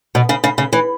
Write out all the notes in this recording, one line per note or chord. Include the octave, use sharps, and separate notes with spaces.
B2
C#3
C#3
C#3
E3